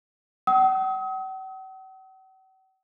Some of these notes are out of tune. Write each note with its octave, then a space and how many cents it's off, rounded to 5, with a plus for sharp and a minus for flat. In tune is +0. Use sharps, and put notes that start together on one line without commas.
F#5 +45 D#6 +40